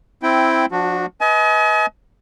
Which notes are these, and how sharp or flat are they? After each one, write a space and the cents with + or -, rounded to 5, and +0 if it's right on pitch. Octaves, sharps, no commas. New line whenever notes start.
C4 +0 E4 +0 G5 -5
F3 +25 D4 +5 F#4 -15
B4 +0 D#5 +35 G#5 +40